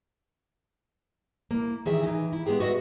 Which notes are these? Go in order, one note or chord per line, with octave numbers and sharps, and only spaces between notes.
A#3 E4
D#3 E3 G#4 E5
E3 D#4
E4
G#3 B3 G4 G#4 G5
F#4 B4 D#5 E5